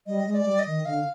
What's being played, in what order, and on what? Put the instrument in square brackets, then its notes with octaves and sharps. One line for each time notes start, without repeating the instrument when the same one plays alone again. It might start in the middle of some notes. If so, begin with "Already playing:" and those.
[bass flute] G3 [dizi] D#5
[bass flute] G#3
[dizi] D5
[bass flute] G3
[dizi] D#5
[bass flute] D#3
[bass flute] D3 [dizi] F5